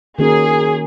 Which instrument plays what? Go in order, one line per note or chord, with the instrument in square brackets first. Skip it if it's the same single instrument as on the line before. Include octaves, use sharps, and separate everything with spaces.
[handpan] D#3 A#3 C#4 F#4 A#4 [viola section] G#4